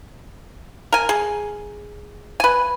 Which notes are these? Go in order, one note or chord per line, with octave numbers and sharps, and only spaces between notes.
A#4 G#5
G#4
B4 G#5